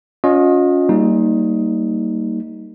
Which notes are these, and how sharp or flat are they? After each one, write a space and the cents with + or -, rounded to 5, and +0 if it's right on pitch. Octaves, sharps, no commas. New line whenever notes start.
C#4 +20 F4 +40 D#5 +0
G3 -15 A#3 -15 D#4 +10